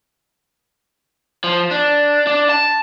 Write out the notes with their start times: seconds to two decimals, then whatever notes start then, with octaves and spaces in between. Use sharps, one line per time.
1.44 F3
1.71 D4
2.27 D4
2.49 A5